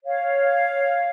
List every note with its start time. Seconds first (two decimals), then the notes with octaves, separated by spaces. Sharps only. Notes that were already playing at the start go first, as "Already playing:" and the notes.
0.05 C#5 F5